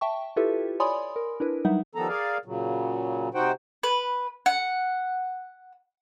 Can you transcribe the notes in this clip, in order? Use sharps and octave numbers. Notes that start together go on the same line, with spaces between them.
E5 G5 A5 C#6
E4 F4 G4 A4 B4 E5
C#5 D5 G#5 B5 C6 D#6
A#4
D4 E4 A#4 B4
F#3 G3 D#4 E5 F#5
D#3 F3 G3 B3 A4 A#5
G#4 A#4 D5 F5
A#2 C#3 F#3
C3 D#4 F#4 C5 F#5 G5
B4
F#5